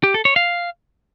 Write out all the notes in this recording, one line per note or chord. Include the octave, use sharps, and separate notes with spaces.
G4
A4
C#5
F5